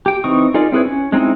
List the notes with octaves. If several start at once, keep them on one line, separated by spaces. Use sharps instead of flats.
G4 G5
E3 C4 D#4 C#6 D#6
D#4 F4 G#4 A#4 D5
C4 E4 G#4 B4 C#5
C#4
G#3 C4 D#4 E4 G#4